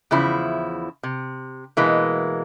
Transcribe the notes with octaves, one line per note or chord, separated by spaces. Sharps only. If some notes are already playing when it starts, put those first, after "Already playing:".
E2 C#3 F3 E4
C3
B2 E3 G#3 A#3